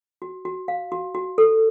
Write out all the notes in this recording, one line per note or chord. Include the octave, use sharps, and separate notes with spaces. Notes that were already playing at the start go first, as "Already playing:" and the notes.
F#4
F#4
F5
F#4
F#4
A4